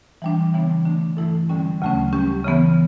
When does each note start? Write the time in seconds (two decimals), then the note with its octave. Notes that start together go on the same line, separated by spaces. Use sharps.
0.22 E3 G3 D4
0.54 C#3 E3 G3 B3 D4
0.85 D3 A3 D4
1.17 G2 E3 A3 E4 A4
1.49 D3 G3 C#4
1.82 D2 C#3 F#3 A3 C#4
2.13 G3 C#4 G4
2.45 C#3 E3 B3